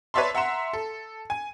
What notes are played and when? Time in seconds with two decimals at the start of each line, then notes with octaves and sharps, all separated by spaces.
0.14 B4 C#5 D5 E5 A5 C6
0.35 E5 F#5 A#5 C6 E7
0.73 A4
1.30 G#5